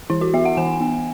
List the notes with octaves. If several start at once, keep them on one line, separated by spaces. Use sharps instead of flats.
E3 E4
F#4
B3 E5
F#5
E3 G#5
B3